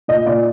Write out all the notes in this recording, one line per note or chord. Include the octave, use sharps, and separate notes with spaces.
A#2 D#5
A#2 D5